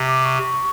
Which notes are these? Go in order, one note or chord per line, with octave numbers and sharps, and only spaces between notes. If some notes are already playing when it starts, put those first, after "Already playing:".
Already playing: C3
D6
C#6